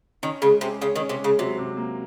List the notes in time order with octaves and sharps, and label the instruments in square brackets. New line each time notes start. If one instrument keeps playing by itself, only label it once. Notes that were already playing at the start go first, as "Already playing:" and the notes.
[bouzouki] D#3 [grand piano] C#4
[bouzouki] C#3 [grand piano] G#3
[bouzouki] C3 [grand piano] G#4
[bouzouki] C#3 [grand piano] C#5
[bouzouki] D#3
[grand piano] C#4
[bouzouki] C3
[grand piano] G#3
[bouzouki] C#3
[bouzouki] C3 [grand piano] F#3
[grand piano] C3
A#3